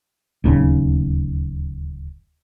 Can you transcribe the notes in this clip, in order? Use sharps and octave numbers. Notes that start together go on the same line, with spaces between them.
D1 D#2 C#3